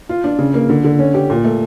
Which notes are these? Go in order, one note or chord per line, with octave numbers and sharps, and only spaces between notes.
F4
D4
C#3
A#3
D3
D3
C#4
G4
A#2
A3